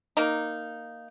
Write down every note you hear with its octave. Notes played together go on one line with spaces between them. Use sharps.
A#3 D#4